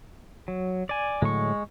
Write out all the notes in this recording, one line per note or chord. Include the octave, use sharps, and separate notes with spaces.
F#3
D5 G#5
A2 D3 F#3 G#3 C#6